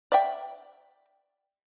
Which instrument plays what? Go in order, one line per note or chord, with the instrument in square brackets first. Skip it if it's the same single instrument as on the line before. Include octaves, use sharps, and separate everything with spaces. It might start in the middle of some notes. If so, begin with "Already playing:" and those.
[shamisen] D5 E5 G5